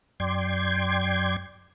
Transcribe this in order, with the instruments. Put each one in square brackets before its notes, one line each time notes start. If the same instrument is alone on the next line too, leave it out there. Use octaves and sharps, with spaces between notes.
[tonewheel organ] F#2 D5 G5 C6 G#6